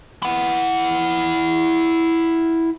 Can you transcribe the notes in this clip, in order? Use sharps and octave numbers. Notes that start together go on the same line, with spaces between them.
E4 F#5